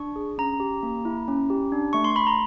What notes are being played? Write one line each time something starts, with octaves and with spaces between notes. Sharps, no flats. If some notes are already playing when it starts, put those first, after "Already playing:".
Already playing: D4 C#6
G#4
C#4 A#5
G4
A#3
E4
C#4
G4
D4
A3 C#6
C6
A3 B5
A#5